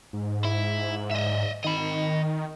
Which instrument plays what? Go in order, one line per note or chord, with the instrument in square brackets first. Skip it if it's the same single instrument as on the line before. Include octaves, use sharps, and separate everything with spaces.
[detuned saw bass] G#2
[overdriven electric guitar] E4
D#5 E5
[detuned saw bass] D#3 [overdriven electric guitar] D#5 B5